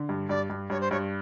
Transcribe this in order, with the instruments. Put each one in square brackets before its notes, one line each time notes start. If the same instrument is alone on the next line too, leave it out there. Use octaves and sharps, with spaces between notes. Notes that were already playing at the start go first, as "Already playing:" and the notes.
Already playing: [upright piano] D3
G2
[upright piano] G2 [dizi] D5
[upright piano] G2
[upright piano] G2 [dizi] C#5
[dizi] C5
[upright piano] G2 [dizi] C#5